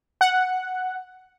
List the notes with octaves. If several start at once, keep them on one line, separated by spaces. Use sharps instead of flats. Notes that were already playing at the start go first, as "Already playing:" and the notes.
F#5